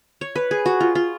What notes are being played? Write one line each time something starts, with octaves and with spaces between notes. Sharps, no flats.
C#5
B4
G#4
F#4
F4
F4